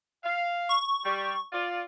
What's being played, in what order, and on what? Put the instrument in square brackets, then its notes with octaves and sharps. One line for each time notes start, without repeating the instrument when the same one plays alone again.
[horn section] F5
[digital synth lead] C#6
[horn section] G3
F4 D5